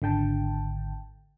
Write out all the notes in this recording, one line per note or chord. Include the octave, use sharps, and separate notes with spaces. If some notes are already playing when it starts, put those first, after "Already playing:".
G#1 D3 G5 A5